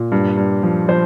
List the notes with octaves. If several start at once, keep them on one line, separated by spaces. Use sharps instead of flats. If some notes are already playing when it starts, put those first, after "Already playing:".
Already playing: A#2
G2
G2
F3
F3 C5